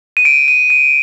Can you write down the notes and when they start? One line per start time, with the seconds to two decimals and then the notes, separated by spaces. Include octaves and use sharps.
0.17 D#7
0.25 D7
0.48 D#7
0.70 D#7